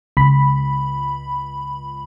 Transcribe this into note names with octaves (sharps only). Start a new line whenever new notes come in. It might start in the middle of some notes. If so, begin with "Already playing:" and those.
C#2 B5